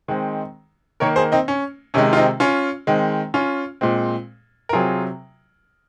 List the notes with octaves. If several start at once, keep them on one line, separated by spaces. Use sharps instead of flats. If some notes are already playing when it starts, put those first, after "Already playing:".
D#3 G#3 C4
D#3 A#3 A#4 C#5
G#4 C5
C4 D#4
C#4
C3 D#3 G#3 C#4
F4
C4 D#4
C#4 F4
D#3 G#3 C4
C#4 F4
A#2 G#3 C4
A#4
C3 F#3 C4 F4 G#4